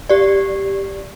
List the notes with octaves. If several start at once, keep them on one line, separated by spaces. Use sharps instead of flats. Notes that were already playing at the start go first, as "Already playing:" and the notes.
G4 D5